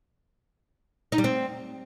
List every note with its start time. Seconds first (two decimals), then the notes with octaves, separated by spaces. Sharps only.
1.12 D#4
1.18 G3
1.24 C4